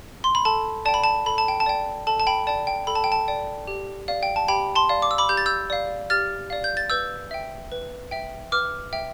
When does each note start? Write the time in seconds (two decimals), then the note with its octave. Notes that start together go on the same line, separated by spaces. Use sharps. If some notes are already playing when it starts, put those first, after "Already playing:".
0.24 C6
0.35 B5
0.45 A4 A5
0.85 D5 G5 A5
0.94 B5
1.04 A5
1.26 A4 B5
1.38 A5
1.48 G5
1.60 A5
1.66 D5 G5
2.07 A4 A5
2.20 A5
2.27 G5 B5
2.47 D5 G5 A5
2.67 G5
2.87 A4 B5
2.95 A5
3.04 G5
3.12 A5
3.28 D5 G5
3.67 G4
4.08 D5 F5
4.23 G5
4.36 A5
4.48 G4 G5 B5
4.75 A5 C6
4.89 D5 F5
5.02 D6
5.11 E6
5.18 B5 D6
5.29 G4 G6
5.37 A6
5.46 E6 G6
5.70 D5 F5
6.10 G4 F6 A6
6.50 D5 F5
6.64 G6
6.77 A6
6.90 B4 E6 G6
7.31 E5 G5
7.72 B4
8.11 E5 G5
8.52 B4 D6 F6
8.93 E5 G5